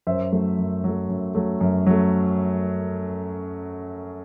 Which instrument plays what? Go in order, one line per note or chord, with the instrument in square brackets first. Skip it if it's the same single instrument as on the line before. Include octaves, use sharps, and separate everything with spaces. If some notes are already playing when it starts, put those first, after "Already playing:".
[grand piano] F#2 C5 E5
F#3 A3
F#2
F#3 A3
F#2
F#3 A3
F#2
F#3 A3